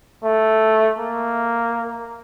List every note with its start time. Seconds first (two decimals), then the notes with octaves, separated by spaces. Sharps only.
0.24 A3
0.98 A#3